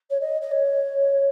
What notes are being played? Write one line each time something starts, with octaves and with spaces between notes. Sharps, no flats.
C#5
D#5
D#5
C#5